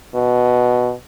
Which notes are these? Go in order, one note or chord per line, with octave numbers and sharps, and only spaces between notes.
B2